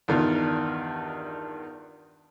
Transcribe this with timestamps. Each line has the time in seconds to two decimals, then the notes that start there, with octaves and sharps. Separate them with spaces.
0.08 E2 G2 D#3 F4